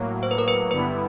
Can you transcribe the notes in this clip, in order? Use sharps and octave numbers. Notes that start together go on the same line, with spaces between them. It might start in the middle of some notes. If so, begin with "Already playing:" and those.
Already playing: A2 F#3 A#3
C5
B4
A#4
B4
G2 D3 G3 B3 E4 B4